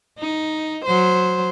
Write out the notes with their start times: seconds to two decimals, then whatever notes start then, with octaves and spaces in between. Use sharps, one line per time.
0.19 D#4
0.86 F#3 C5